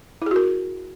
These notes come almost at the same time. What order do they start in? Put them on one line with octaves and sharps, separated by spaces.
E4 G#4 F#4 A#4